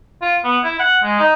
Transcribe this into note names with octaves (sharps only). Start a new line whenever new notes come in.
F4
B3
E4
F#5
G#3
D#4